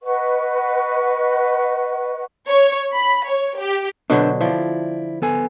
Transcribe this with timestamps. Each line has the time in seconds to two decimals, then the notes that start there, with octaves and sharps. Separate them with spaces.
0.03 B4 D#5 F#5 C#6
2.47 C#5
2.94 B5
3.28 C#5
3.58 G4
4.10 B2 D3 F#3 D4 B4 C5
4.41 F3 E4 D5
5.22 B3 A4 G#5